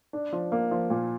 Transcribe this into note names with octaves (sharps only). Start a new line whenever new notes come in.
D4
F3
A#3
F3
A#2